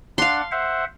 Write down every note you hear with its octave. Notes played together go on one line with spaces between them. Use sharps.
D4 F5 F#5 C6
C5 E5 F#5